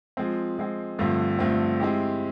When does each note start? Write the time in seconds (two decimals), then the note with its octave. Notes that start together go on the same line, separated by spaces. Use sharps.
0.17 F3 G#3 C4
0.57 F3 G#3 C4
0.99 G2 D3 F3 A3 C4
1.39 G2 D3 F3 A3 C4
1.80 G#3 C4 E4 G4